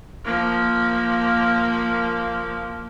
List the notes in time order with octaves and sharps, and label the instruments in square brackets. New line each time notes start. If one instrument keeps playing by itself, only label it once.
[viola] F3 A#3